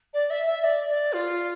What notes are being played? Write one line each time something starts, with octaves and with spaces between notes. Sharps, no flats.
D5
E5
E5
D5
D5
F4